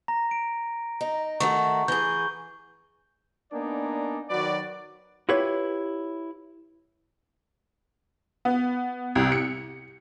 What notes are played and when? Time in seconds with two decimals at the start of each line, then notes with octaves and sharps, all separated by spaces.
0.08 A#5 A#6
0.31 D7
1.01 D#4
1.40 D#3 A3 F#4 C#6
1.88 E3 G#4 G6 G7
3.52 A#3 B3 D4 D#4 D5 G#5
4.30 D#3 F#3 F#4 B4 D5
5.29 E4 F4 G4 B4 C#5
8.45 B3
9.15 C2
9.32 C#7